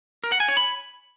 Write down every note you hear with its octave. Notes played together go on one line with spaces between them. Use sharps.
A#4
F#5
G#5
C#5
B5